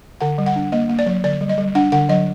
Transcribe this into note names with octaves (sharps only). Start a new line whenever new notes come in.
D3 F#5
G3
F#5
D4
A#3 D#5
A#3
D5
F#3
D3 D5
G3
D#5
G3
D4 F#5
D3 F#5
F#3 D#5